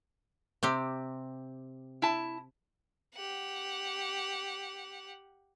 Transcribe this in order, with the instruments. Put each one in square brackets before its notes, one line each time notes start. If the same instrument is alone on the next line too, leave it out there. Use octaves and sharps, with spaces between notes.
[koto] C3 C4 G4
[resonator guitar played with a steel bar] E4 A5
[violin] G4 F#5